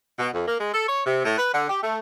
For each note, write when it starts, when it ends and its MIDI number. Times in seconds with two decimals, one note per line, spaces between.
0.19 0.28 47
0.34 0.43 41
0.47 0.55 58
0.60 0.73 56
0.74 0.87 69
0.88 1.03 73
1.06 1.24 48
1.25 1.36 45
1.38 1.50 71
1.53 1.67 50
1.69 1.81 67
1.82 1.98 57